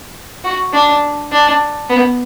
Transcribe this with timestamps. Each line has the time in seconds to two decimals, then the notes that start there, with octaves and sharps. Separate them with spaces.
0.44 F#4
0.73 D4
1.32 D4
1.90 B3